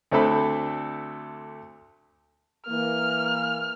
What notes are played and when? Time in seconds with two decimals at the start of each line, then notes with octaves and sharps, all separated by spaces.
0.12 D2 A3 C4 D4 A4 B5
2.68 E3 A#3 F6